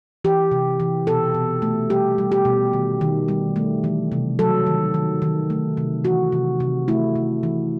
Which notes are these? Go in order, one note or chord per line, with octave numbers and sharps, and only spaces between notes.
E3 G4
C3
E3
B2 A4
B2
A3
G3 G4
G3
G4
B2
D#3
D#3
G3
A3
E3
C3
F#3 A4
D#3
D#3
D#3
A3
C3
E3 F#4
C3
C3
A3 E4
C3
E3